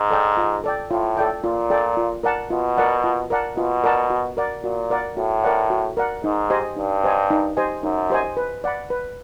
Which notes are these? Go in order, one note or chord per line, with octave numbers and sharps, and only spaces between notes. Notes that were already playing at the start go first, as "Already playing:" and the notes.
Already playing: G#2
A4 D5 G5
F4
A4 D5 G5
A2 F4
A4 D5 G5
A#2 F4
A4 D5 G5
F4
A#4 D5 F#5 A5
B2 F4
A#4 D5 F#5 A5
F4
A#4 D5 F#5 A5
B2 F4
A#4 D5 F#5 A5
F#4
A#4 D5 F#5
A#2 F#4
A#4 D5 F#5
A2 F#4
A#4 D5 F#5
F#4
A#4 D5 F#5
G#2 D#4
G4 C5 D#5 G#5
G2 D#4
G4 C5 D#5 G#5
D#4
G4 C5 D#5 G#5
F#2 D#4
G4 C5 D#5 G#5
B4
D5 F#5 B5
B4